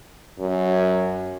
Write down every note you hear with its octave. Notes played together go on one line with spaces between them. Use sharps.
F#2